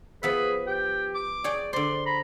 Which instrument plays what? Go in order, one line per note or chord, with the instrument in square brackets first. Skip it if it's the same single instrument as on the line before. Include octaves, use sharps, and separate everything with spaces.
[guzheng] F3 B3 E5 [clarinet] G#4 [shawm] B4
[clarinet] G4 [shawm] G5
[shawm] D6
[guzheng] G#4 C#5 G5 [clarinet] D5
[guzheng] D3 C5 [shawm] D5 [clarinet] C6
[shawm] A#5 [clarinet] B5